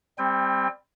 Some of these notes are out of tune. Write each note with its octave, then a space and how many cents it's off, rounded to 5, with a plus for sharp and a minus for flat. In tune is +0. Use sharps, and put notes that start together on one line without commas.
G3 +15 C4 +0 G5 +30